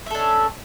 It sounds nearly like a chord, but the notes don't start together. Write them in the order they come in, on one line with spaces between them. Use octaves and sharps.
E5 A4 D4 C#4